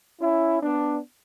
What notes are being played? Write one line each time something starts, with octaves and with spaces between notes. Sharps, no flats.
C#4 E4
B3 D4